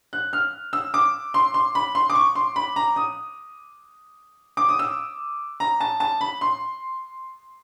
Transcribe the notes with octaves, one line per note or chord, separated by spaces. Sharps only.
F#6
F6
E6
D6
C6
C6
B5
C6
D6
C#6
C6
B5
A#5
D#6
D6
D#6
E6
A#5
A5
A5
B5
C6